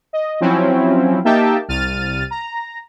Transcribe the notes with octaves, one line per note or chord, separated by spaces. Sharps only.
D#5
F3 F#3 C4 C#4 E4
A#3 D#4 G4 E5 G5 A5
C2 F6 A6 D#7
A#5